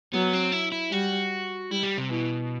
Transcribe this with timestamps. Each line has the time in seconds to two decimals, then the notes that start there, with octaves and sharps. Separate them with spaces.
0.13 F#3 B3
0.33 C4
0.52 E4
0.72 E4
0.91 G3 F#4
1.71 G3 E4
1.83 G3
1.98 C3
2.10 B2 E3